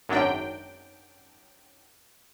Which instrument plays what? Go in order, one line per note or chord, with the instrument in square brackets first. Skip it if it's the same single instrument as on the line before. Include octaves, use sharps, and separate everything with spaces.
[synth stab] G#1 F#2 F#3 D4 G5